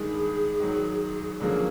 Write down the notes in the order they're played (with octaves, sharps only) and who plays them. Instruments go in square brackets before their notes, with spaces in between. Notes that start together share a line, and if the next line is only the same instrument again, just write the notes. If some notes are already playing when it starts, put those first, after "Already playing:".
Already playing: [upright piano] G2 D#3 G#3 [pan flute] G#4
[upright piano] G#2 D#3 F#3
[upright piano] F2 D3 F#3 A#3 C#4 [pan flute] G#4